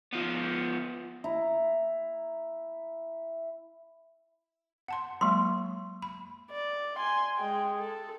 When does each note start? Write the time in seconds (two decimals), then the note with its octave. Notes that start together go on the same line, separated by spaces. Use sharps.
0.13 F3 B3
1.24 E4 A#5
4.88 F#5 A5 C6
5.21 F#3 G#3 A#3 C6
6.02 B5
6.51 D5
6.96 G#5 C6
7.36 G#3 G5
7.79 A4